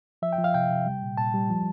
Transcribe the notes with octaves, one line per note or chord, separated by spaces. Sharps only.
F3 E5
G5
F3
F5
C3 G5
C3
G3
A#2
A#2 A5
G3
F3